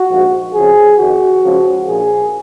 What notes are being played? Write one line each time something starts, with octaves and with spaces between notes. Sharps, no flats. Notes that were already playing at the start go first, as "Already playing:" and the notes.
Already playing: F#4
A#1 G#2 F3
F2 C#3 F3 G#4
F2 D#3 F#4
C#2 C#3 F3
A#1 A#2 F3 G#4